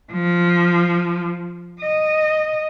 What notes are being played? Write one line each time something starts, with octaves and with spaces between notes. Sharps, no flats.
F3
D#5